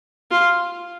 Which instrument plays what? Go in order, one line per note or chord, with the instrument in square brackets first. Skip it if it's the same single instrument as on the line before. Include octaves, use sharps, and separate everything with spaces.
[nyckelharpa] F4